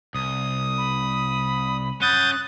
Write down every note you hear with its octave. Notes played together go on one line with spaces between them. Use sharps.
C2 D#6
B5
C#4 F#5 D#6 F#6 G6 A6